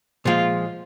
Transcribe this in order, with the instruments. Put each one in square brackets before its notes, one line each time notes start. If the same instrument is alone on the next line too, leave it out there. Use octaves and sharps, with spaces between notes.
[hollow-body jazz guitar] A#2 F3 G#3 [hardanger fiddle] F4